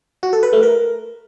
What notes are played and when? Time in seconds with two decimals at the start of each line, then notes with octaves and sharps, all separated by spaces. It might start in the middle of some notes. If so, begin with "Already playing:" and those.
0.23 F#4
0.33 A4
0.43 B4
0.53 A3
0.63 A#4